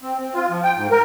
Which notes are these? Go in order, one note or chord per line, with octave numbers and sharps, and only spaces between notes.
C4
C4
F4
F3
G5
G#2
A#4